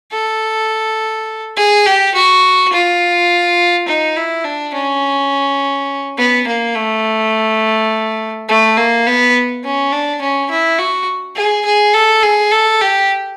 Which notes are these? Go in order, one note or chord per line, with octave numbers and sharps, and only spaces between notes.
A4
G#4
G4
F#4
F4
D#4
E4
D4
C#4
B3
A#3
A3
A3
A#3
B3
C#4
D4
C#4
E4
F#4
G#4
G#4
A4
G#4
A4
G4